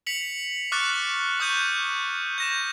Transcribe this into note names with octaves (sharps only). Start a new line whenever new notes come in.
B6 C#7 F7 F#7
C#6 D6 F6 F#6 A6 C#7
C#6 D#6 F#6 G6 D#7
G6 A#6 E7